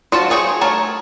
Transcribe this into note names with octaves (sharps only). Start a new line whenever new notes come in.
F4 F#4 C5 A5
F4 G#4 C#5 F#5 G5
A3 A#4 C#5 A5